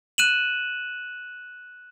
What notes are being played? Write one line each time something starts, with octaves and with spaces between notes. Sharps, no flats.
F#6 D#7 E7 F#7